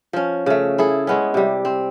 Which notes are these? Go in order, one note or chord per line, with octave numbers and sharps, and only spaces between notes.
F3 C#4
C#3 A3
E4 G#4 A4
G#3 B3 C#4
C3 G3
C4